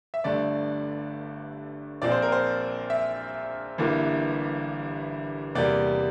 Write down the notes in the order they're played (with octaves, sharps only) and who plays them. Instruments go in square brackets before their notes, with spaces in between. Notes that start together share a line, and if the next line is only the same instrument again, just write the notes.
[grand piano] E5
G1 G2 D3 A3 D5
A#1 A#2 F3 C4 D5
C5
A#4
C5
E5
G1 G2 E3 A#3
E2 C3 G3 A#3 D5